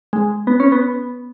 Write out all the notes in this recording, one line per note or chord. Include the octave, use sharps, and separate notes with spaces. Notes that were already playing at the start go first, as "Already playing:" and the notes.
G#3
B3
C#4
B3